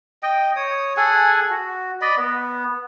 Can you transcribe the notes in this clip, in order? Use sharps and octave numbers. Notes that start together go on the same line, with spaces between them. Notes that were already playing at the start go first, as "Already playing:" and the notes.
D#5 G5
C#5 D#6
G#4 A4 F#5 G#5
F#4
D5 D#5 B5
B3